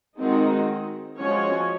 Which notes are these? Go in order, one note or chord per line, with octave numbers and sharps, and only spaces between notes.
D#3 G#3 C4 D#4 F#4
F3 G#3 C#4 F#4 C#5